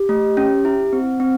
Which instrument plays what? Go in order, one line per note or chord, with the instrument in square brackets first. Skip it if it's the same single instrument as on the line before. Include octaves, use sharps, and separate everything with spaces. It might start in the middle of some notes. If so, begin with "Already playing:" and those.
Already playing: [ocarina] G4
[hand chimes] A3
C#4
E4
C4
C4